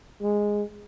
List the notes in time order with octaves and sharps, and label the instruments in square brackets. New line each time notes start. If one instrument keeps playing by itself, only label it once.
[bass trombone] G#3